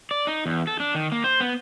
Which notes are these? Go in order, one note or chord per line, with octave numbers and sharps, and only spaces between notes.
D5
D#4
E2
A4
D4
D#3
A#3
C5
B3